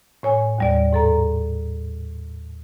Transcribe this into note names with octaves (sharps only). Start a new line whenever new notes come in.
A2 C#5 G#5
D#2 G3 D5
G#2 A4 A#5